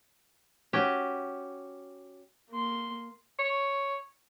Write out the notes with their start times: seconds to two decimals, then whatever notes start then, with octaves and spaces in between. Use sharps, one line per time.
0.73 C#4 F#4 G4
2.50 A#3 C6
3.39 C#5